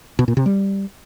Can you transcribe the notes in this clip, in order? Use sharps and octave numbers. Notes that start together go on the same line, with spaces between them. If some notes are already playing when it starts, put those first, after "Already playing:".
B2
A#2
C3
G3